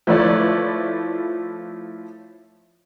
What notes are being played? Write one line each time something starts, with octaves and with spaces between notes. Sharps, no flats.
F3 A3 E4 B4 C#5 D5